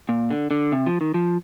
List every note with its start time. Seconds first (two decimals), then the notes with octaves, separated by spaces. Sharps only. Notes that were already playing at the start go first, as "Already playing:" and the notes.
0.09 A#2
0.31 D3
0.51 D3
0.72 C3
0.86 F3
1.01 D#3
1.14 F3